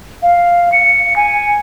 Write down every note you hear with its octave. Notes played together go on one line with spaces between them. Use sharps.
F5
C#7
G#5